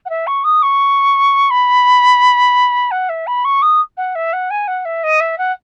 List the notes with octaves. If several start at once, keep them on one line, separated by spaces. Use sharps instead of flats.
F#5
E5
C#6
D#6
C#6
B5
F#5
E5
B5
C#6
D#6
F#5
E5
F#5
G#5
F#5
E5
D#5
E5
F#5